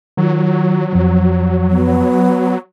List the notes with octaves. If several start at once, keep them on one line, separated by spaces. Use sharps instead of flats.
D#3 F#3 F4
F2 F3
B3